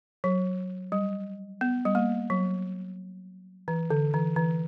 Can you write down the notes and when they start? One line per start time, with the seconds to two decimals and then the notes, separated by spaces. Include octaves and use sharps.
0.24 F#3
0.92 G3
1.61 B3
1.85 G3
1.95 A#3
2.30 F#3
3.68 E3
3.90 D3
4.14 E3
4.36 E3